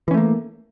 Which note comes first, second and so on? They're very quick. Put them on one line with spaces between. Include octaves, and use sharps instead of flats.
E3 C#4 A3 A#3